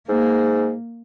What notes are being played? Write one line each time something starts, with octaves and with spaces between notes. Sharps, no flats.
G#2 A#3